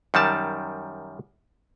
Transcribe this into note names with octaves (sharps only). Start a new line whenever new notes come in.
F#2 D#3 G3 A5